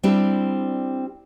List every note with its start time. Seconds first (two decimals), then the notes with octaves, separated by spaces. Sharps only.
0.03 G3 C4 D4 E4 G4